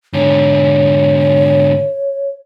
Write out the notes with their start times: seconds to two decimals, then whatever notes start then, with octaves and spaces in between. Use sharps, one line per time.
0.14 G#2 D3 C#5